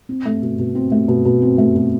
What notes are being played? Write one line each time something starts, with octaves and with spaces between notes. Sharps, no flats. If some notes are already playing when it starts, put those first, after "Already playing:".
C4
A3
B2
B2
C4
A3
B2
B2
C4
A3
B2